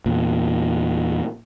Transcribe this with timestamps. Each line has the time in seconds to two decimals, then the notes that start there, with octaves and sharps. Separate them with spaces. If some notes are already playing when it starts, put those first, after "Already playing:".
0.06 E2 A#2